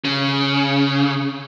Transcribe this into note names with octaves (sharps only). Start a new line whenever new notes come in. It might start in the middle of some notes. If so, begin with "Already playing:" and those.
C#3